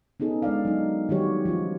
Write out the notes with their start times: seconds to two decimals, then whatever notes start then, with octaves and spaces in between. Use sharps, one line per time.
0.20 B3 C#4 D#4 G#4 A4
0.42 G#3 D4 D5 F5
0.65 F#3 D#4
1.09 D#3 F#3 G3 F#4 G4 C#5
1.45 F3 C#4 F4